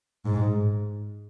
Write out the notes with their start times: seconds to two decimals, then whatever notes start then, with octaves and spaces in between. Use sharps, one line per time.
0.26 G#2